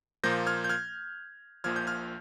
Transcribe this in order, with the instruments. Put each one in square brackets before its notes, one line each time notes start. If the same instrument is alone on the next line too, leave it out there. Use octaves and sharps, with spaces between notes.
[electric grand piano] A#2 F3 A#3 G6 A#6
F6 G#6
G6
F6 G#6
A#1 A#2 F3 F6 G#6
G6
F6 G#6